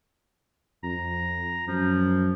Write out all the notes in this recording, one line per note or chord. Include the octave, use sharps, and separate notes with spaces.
F2 A#5
F#2 F3